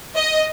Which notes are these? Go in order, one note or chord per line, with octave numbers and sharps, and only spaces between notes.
D#5